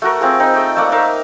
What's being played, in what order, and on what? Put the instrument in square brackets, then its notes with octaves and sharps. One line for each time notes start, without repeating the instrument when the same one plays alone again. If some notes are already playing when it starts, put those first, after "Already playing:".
[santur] A3 F#4 A#4
C4 F4 G#4
C4 D#4 B5
A3 D#5 G5
A3 A#3 D5 F#5
D#4 A#4 E5 F5